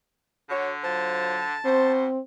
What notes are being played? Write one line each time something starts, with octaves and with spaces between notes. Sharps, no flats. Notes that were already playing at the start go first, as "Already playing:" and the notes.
D3 F#4 C#5
F#3 F4 C5 A5
B2 C4 C5